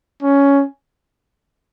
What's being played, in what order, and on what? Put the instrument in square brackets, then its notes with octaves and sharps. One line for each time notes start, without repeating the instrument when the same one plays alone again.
[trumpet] C#4